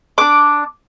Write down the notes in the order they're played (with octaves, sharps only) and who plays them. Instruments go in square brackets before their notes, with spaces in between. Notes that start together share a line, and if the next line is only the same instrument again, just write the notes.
[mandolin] D4 D6